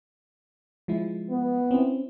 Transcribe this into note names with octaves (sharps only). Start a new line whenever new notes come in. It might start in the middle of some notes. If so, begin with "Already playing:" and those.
F3 G#3 E4
B3
C4 C#4 E4